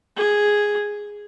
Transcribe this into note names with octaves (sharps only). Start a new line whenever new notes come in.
G#4